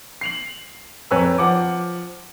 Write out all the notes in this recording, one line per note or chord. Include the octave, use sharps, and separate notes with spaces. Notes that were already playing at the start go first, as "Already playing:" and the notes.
C7 F7 F#7
F2 B4 C#5 G#5 A#5 E6
F3 F#5 D6